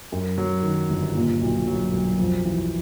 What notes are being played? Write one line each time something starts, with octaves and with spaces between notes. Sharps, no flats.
F#2
F#3
D#3
G1
A#2
B1
F#3
B1
F2
E3